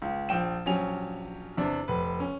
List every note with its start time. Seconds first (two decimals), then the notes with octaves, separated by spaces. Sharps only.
0.02 C#2
0.29 A#1 G5 E7
0.66 A#1 F#3 C#4 G4 G#5 F7
1.57 E2 C3 D4
1.88 F1 B4
2.20 C#4